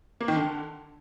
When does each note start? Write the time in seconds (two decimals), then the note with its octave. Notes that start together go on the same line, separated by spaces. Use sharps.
0.21 A#3
0.28 D#3
0.36 D3